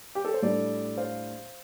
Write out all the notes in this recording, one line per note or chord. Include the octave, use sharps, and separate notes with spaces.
G4
A4
C5
A2 G3 D4 A4 D5
C5 F5